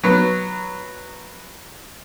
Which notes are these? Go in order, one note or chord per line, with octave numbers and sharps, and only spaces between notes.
F#3 B3